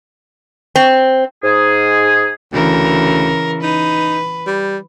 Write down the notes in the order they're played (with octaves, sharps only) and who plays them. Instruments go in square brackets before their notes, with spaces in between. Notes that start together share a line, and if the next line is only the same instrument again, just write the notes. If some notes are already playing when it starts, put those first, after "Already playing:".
[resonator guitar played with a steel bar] C4
[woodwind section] G#2 G#4
[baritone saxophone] D2 [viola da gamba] C#3 E3 A#4
[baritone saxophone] D#4 [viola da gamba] B4
[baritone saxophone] G3